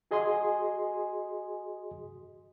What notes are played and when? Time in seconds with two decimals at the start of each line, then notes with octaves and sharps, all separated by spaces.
0.11 F#4 G#4 D#5 G#5 C6 D#6